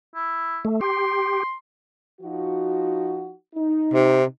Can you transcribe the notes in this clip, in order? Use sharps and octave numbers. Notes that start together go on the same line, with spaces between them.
E4
A3
G4 C6
F3 D#4 F#4
D#4
C3